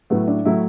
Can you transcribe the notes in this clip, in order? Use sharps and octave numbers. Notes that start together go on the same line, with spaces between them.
A2 F#3 A3 B3
D4
A2 F#3 A3 E4